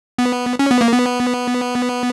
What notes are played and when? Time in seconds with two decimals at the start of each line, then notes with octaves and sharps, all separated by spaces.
0.18 B3
0.59 C#4
0.71 B3
0.81 A#3
0.92 B3